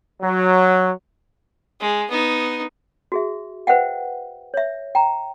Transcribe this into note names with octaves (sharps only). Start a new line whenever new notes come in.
F#3
G#3
B3 D#4
F#4 G#4 E5
B4 C5 E5 F#5 G5
C#5 E5
G5 A#5